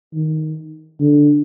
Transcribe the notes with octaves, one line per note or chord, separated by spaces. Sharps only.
D#3
D3